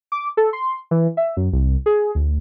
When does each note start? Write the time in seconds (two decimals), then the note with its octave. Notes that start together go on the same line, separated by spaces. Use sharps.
0.12 D6
0.37 A4
0.53 C6
0.91 E3
1.17 E5
1.37 F#2
1.53 C2
1.86 G#4
2.15 D2